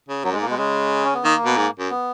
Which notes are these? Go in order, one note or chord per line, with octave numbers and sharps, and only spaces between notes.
C#3
F#2 F#3
G#3
G#2
A#3
B2 G#3
C#3 G#3
C#4
B3
D#3 A#3
B2
G#2
F#2
B3